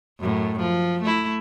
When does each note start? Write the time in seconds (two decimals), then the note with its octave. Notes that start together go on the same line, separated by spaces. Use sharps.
0.20 F#2 A2
0.59 F3
1.02 A3 E4